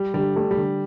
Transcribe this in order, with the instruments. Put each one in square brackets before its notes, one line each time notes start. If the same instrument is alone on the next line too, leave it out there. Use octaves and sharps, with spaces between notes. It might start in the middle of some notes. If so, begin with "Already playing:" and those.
Already playing: [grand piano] G3
[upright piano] D3 [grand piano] G3
[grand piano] G3 [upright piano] A3
[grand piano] G3
[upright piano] D3